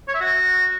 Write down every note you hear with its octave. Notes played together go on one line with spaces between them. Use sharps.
C#5
E5
F#4